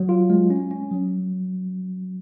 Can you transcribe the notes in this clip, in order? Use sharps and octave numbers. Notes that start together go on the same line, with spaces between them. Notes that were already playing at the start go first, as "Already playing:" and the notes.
Already playing: F#3
F4
G#3
C#4
C#4
F#3